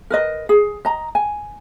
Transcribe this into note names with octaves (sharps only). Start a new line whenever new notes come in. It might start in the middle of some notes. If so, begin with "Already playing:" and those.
A#4 B4 D#5
G#4
D#5 A#5
G#5